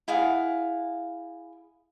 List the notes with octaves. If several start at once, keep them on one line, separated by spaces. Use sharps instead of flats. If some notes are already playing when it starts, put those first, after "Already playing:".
E4 G#4 F5 F#5